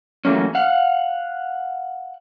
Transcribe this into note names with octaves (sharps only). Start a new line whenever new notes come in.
E3 F#3 A3 A#3 C#4
F5 F#5